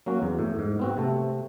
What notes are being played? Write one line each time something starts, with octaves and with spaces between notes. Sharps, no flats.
F#3 A#3 C#4 F#4
E2
A2
G#2
B3 C4 F#4
C3 A3